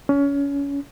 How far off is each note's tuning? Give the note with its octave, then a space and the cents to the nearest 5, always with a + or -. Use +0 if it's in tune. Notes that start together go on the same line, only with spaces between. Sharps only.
C#4 +25